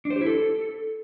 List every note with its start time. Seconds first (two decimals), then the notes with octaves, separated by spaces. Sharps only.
0.05 D4
0.10 C5
0.16 G4
0.21 E4
0.26 A4